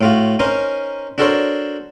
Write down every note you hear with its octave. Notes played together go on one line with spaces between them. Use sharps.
A2 F4 F#4
C#4 D#4 A#4 C5
D4 F#4 A4 A#4 C5 C#5